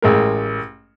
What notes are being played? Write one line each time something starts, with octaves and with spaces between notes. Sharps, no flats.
A1 G#3 A#4